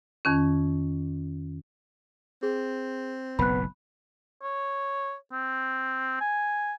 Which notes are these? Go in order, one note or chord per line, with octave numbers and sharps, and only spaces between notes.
F2 D#3 C#4
C4 G#4
F#1 B1 A2 B3 B5 F#6
C#5
C4
G#5